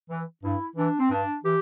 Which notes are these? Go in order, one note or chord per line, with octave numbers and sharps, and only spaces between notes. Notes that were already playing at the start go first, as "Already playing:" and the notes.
E3
G2 E4
E3 D4
C4
G2 D4
E3 G4